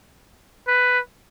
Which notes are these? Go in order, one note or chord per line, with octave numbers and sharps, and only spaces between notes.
B4